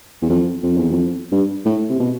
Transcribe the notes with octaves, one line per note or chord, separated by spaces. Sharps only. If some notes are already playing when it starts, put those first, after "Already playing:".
E2
F2
F2
E2
F2
G2
A2
C3
B2